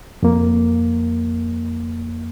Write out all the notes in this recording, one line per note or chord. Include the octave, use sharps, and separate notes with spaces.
F2 A#3